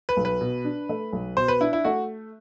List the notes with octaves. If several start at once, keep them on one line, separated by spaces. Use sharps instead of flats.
B4
B1
B4
B2
D4
A3
B1
B2 C5
B4
D4 E4
E4
A3 F#4